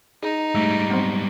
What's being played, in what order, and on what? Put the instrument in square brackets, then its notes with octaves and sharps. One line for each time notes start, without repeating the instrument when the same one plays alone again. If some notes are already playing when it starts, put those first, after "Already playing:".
[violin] D#4 [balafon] G#4
[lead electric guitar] G#2 G3 [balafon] A3
[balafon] F#3 B3 C4